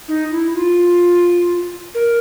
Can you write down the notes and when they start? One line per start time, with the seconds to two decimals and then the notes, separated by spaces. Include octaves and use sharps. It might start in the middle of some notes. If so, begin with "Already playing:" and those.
0.08 D#4
0.31 E4
0.55 F4
1.95 A#4